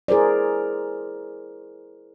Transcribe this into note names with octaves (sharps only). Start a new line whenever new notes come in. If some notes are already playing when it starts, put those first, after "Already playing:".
E4 G#4 A#4 C5 D5